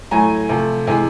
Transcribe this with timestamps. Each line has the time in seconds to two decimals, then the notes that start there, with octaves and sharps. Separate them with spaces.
0.11 A2 F#3 A3 G#5 A#5
0.49 C3 F3 A3
0.87 C3 E3 G#3 G#5